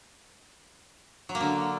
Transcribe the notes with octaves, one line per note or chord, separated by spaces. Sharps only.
F#3
A#3
D3